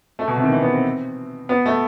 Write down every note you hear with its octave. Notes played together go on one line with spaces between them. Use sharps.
A3
B2
C3
D#3
E3
B3
C4
B3
A3